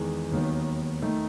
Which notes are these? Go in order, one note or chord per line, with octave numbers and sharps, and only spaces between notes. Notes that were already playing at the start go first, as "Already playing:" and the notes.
Already playing: E2 D#3 G#3
D#2 D#3 F#3 B3
D#3 A3 D#4